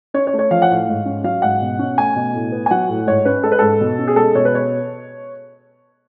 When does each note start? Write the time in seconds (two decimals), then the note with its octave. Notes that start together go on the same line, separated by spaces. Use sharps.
0.14 C#4 C#5
0.27 C#5
0.33 A3
0.39 C#5
0.51 F3 F5
0.62 F#5
0.70 A2 F5
0.88 G#2
1.05 C#4
1.24 F#3 F5
1.42 G#2 F#5
1.61 B2
1.79 C#4
1.97 A3 G#5
2.16 B2
2.34 A2
2.52 B3
2.66 G#5
2.71 F#3 F#5
2.89 A2
3.07 G#2 C#5
3.25 C#4 B4
3.43 G#3 A4
3.52 B4
3.59 G#2 A4
3.81 B2
3.99 C#4
4.08 G#4
4.16 G#3 A4
4.35 B2 C#5
4.45 B4
4.55 C#5